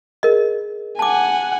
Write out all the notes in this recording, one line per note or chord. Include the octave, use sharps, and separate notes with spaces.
G#4 A#4 D#5
F#5 G#5 A5 D6